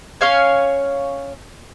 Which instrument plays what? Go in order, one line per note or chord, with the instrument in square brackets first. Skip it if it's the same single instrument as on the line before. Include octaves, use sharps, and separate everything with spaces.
[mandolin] C#4 C#5 F5 G#5